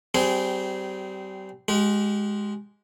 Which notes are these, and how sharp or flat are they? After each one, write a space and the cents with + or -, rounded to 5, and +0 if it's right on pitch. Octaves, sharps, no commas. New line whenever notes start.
G3 -30 C4 -20 G#4 +0
G#3 +0 G4 -35